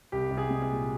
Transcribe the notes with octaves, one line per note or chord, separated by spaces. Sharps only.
C2 G4
C2
G#4
G#3
G#4
A#2